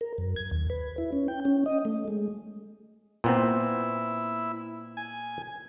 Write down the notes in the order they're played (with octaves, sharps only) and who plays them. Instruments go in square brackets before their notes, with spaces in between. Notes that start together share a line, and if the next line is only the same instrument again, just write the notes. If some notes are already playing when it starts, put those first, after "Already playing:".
[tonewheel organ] A#4
F#2
G#6
D#2
B4
E4
C#4
G5
C#4
D#5
A3
G#3
[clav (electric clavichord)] A#2 B3 C4 [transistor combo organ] E4
[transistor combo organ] G#5